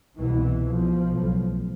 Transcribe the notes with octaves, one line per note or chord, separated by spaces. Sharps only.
C2 B2 E3
B1 B2 F3
B1 A2